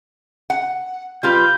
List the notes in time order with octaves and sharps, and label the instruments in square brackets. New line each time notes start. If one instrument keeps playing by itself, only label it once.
[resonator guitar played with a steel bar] F#5
[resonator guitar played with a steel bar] G3 F4 B4 [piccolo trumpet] G6